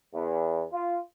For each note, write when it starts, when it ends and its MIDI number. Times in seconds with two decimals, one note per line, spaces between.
0.14 0.63 40
0.71 0.98 65